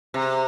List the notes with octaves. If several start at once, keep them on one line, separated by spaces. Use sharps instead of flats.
C3